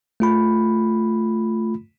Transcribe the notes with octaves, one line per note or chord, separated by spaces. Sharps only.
A3 F4 B5